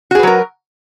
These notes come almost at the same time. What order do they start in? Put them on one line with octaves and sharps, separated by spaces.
F#4 G#4 B4 F#3 A#4